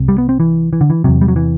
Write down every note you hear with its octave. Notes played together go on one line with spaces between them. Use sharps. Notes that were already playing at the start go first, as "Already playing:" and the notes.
Already playing: C2 C3
G3
B3
C4
E3
E3
D3
E3
E2 C3 F#3
G3
F#3
E3